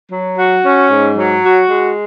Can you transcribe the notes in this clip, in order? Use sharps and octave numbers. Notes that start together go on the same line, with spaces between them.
F#3
F#4
C#4
G#2
F#3
F#4
G#3